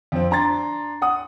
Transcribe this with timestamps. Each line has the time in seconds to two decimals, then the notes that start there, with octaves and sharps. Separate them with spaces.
0.12 F2 C4
0.31 D4 A#5 C6 A6
1.02 F#5 D#6